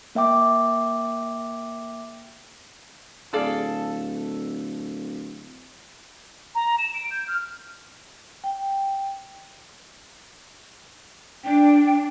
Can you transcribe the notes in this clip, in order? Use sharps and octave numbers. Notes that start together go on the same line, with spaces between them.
A#3 E5 G5 D6
D1 G#4 A4 D5 F5
A#5
E7
D7
G6
F6
G5
D4 G5